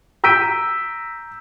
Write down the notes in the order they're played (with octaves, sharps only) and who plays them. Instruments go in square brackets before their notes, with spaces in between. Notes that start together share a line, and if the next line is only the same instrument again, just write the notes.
[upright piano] A#5 E6 G6 B6 D7 D#7